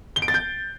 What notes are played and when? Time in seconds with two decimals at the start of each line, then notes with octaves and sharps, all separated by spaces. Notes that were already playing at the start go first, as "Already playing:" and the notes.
0.16 G7
0.22 D7
0.28 A6
0.34 G6